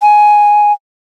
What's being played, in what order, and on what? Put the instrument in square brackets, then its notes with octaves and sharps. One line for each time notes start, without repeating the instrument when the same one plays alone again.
[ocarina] G#5